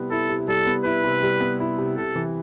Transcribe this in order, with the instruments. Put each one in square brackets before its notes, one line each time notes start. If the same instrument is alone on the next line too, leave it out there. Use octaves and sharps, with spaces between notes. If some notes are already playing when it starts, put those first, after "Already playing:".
Already playing: [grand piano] C3 G3 B3 E4
[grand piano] E4 [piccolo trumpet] A4
[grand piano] C3
[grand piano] G3 [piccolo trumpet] A4
[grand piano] B3
[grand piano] E4 [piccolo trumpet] B4
[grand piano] C3
G3
B3
E4
C3
[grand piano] C3 [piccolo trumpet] A4
[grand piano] E3